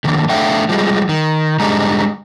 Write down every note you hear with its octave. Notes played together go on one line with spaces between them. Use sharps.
D3 D#3 F3 A#3
D3 A3 E5 F5 G5
F3 G3 G#3
D#3
D3 G3 G#3 D#4